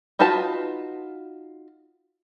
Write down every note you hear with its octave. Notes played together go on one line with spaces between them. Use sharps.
D#4 F4 F#4 B4 A5